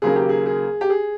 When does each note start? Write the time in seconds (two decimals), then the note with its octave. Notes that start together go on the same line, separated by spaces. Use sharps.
0.02 D#2 C#3 F#3 A#3 G#4
0.16 G4
0.29 G#4
0.46 G#4
0.81 G4
0.90 G#4